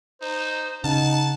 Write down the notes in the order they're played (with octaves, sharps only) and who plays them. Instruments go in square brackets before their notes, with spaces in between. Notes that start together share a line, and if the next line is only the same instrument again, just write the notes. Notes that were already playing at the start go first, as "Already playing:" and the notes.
[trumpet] D#4 [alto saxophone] C5
[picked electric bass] C#3 [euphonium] D#4 [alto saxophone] F#5 [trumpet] A5